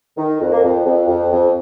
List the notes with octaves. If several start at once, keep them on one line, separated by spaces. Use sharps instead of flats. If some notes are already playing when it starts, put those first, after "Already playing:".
D#3
F2
A#3
F2
F2
F2
F2